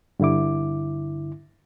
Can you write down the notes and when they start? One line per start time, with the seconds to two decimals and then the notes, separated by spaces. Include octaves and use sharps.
0.20 G2 D3 E4 D6